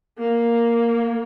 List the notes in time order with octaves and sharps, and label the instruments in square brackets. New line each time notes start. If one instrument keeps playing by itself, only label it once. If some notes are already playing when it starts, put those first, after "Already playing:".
[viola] A#3